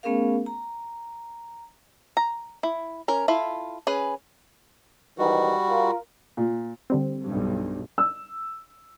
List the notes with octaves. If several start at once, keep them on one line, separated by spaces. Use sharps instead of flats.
A3 B3 C#4 G#4 A#4 F5
A#5
A#5
E4
C#4 A#4
E4 F4 A4
C#4 G#4 B4
G#2 D#3 E3 G3 F#4
F4 A#4
A#2
D3 G3 C4
B1 G2
E6